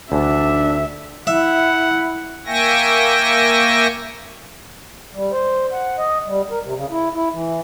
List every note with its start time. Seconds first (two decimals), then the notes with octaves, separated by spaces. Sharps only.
0.12 D2 D4 E5
1.27 E4 E5 F#5
2.46 A#3 E5 G5 G#5 C#6 A#6
5.14 G3
5.32 C5
5.73 F#5
5.98 D#5
6.26 G3
6.51 A#4
6.63 C3
6.76 C#3
6.91 E4
7.14 E4
7.33 E3